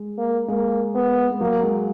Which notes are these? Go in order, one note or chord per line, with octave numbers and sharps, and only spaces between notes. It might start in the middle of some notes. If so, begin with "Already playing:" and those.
Already playing: G#3
A#3
G#3 A#3
B3
G#3
F#3 A#3
G#3